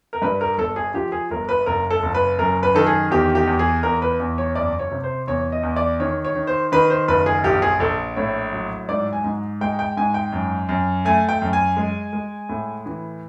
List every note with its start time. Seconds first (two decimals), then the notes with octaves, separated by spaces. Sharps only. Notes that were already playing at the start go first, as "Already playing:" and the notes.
0.13 A#4
0.22 G2 B4
0.41 A#4
0.58 G1 A4
0.76 G#4
0.94 F3 G4
1.12 G#4
1.31 G1 A#4
1.49 B4
1.66 F#1 A#4
1.91 A4
2.03 F#1
2.15 B4
2.38 F#2 A#4
2.63 B4
2.75 D#3 A4
2.86 G#4
3.11 E2 G4
3.35 G4
3.47 E2
3.59 G#4
3.83 E2 A#4
4.02 B4
4.20 E2
4.38 C#5
4.55 F#1 D5
4.79 C#5
4.91 C3
5.04 C5
5.27 E2 C#5
5.52 D#5
5.63 E2
5.76 D5
6.00 D#3 C#5
6.25 C#5
6.35 D#3
6.47 C5
6.72 D#3 B4
6.90 C5
7.08 F#1 B4
7.26 G#4
7.44 A#1 G4
7.62 G#4
7.80 A#1 A4
8.16 A2 C#5
8.52 F#3
8.88 G#2 D5
9.13 G#5
9.24 G#2
9.61 G#3 G5
9.79 G5
9.97 G#2 G#5
10.14 G5
10.32 F#2
10.69 F#2
11.05 A3 G#5
11.29 G5
11.42 F#2
11.53 G#5
11.77 G#3
12.13 G#3
12.49 A2
12.86 E3